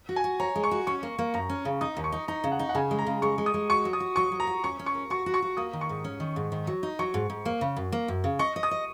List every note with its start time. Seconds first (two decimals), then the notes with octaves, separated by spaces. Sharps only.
0.09 F#4
0.16 G#5
0.24 F#4
0.40 C#5 A#5
0.55 G#3
0.64 C#6
0.71 F#4
0.87 C#4 C#6
1.03 A#3
1.18 A#3
1.34 F#2 A#5
1.49 C#4
1.65 C#3
1.81 D#4 D#6
1.97 D#2
2.04 C#6
2.12 D#4
2.28 D#4 A#5
2.44 C#3
2.52 F#5
2.59 D#4
2.69 F#5
2.75 C#3 G#5
2.91 G#3
2.99 A#5
3.07 C#3
3.22 G#3 C#6
3.38 G#3
3.46 D#6
3.54 G#3
3.70 F#4 C#6
3.85 F#3
3.93 D#6
4.00 F#4
4.16 F#3 C#6
4.32 F#3
4.40 A#5
4.47 F#4
4.64 C#4 C#6
4.79 C#4
4.86 C#6
4.95 A#4
5.10 F#4 C#6
5.26 F#4
5.34 C#6
5.42 F#4
5.57 A#3 D#6
5.73 D#3
5.81 C#6
5.89 G#2
6.04 C#4
6.20 D#3
6.36 G#2
6.52 D#3
6.67 F#3
6.83 D#4
6.99 F#3 C#6
7.14 G#2
7.30 G#2
7.45 A#3
7.61 C#3
7.76 F#2
7.92 A#3
8.08 F#2
8.24 C#3
8.39 D#5 C#6
8.56 D#5
8.63 D#6
8.71 D#5